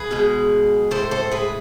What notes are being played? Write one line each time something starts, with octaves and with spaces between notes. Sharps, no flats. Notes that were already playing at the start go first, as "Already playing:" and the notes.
Already playing: G#4 B4
B2 G#3
A2 G#3 A4 C5
A4 C5
G#4 B4